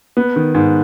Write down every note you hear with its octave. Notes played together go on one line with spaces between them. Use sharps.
B3
D#3
G#2